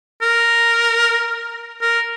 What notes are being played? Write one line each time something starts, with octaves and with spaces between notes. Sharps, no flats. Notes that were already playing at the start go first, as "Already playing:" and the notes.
A#4
A#4